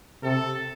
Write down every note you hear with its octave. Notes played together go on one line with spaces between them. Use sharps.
C3 A4